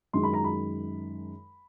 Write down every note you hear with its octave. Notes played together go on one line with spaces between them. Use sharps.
F#2 D#3 G#3 C6
B5
A#5
B5